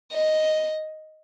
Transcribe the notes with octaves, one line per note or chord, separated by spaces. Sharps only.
D#5